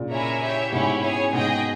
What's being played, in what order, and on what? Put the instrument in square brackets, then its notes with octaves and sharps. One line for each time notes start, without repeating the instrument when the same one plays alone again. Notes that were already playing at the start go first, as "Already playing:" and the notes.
Already playing: [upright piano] A#2 C#3
[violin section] E4 A#4 C#5 E5 G#5
G4 C#5 E5
[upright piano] G#2 B2 [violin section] C#4 E4 G4 C#5
[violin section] G#4 C#5 G#5
[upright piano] G#2 B2 [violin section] G#4 D#5 G5